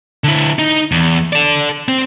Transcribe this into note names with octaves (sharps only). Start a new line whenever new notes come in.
D3 E4
D#4
E2
A4 D5
C4